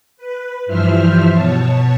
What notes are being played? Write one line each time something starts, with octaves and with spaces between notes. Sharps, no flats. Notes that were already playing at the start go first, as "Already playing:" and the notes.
B4
G2 E3 F3 C5 E5 F6
B2 C#5 A5